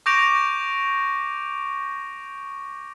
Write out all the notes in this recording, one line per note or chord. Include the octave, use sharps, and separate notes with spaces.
C#6 D6 G6 A#6 D7 F7